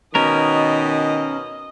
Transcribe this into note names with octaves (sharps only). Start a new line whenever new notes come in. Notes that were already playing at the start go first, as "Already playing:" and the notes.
B2 D#3 C#4 A#4 D#5